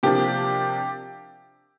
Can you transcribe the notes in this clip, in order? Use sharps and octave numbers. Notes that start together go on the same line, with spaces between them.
C3 F3 A#3 D4 G4